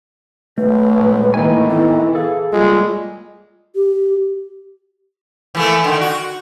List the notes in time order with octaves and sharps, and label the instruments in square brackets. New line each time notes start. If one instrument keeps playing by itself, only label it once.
[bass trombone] B1 [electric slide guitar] A3 [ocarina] B4
[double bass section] A#1 G#3
[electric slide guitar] A2 A#3 G#5 [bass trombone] D#3 [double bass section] E3
[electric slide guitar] B3 A4 [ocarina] E4
[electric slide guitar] G#4 A4 [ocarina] F5
[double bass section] G3 A#3 [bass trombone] G#3 [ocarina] F4
[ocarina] G4
[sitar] E3 A3 A#3
D3 D#3
F#4